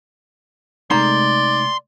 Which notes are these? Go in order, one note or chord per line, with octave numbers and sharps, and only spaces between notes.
C3 G#3 A3 D#4 D5 A#5 C6